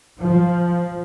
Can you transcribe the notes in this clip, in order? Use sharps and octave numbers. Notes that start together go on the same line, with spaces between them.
F3